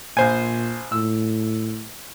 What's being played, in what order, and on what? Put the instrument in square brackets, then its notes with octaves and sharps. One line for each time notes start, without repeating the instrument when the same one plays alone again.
[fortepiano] A#1 C5 G#5 [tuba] A#2
[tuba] A2 [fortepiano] E6